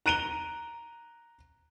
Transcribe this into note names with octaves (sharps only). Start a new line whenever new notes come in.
A#5 F#6 D7 D#7 F7 G7